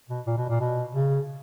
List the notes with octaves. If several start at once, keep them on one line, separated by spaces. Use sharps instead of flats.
B2
A#2
B2
A#2
B2
C#3